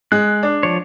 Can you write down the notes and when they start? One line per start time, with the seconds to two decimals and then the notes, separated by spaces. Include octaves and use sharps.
0.12 G#3 F#6
0.43 D4
0.63 F3 C#5